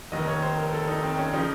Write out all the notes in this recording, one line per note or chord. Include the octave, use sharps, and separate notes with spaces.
F1 D#2 D#3 D#5
C#5
C5
A#4
A4
D#4
C4
C#4
C#3 F3 D#4